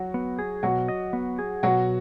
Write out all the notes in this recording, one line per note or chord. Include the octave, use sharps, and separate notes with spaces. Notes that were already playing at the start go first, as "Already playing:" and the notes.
Already playing: F#3 F#4
B3
G#4
B2 F#3 F#4
D#5
B3
G#4
B2 F#3 F#4